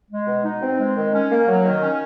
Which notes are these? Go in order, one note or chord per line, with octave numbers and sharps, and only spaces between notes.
G#3
B2
D#4
C4
G#3
D#3
C#4
A#3
F#3
D#3
C#4